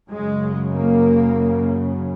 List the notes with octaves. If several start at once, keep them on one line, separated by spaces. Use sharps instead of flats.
F#2 C#3 G#3
A#3